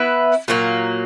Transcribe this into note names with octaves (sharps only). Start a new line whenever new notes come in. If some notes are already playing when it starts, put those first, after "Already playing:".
Already playing: B3 E4 B4 E5
A#2 F#3 A#3